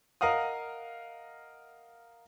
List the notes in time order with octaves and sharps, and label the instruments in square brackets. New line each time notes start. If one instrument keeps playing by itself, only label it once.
[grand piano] A#4 D#5 F5 F#5 D#6